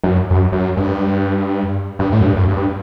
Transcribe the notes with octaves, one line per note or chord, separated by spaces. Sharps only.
F#2
F#2
F#2
G2
G2
A2
F#2
G2
F#2
G2